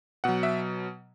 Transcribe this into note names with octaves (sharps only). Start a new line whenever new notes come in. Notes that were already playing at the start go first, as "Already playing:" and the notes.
B2 F#3 F#5
E5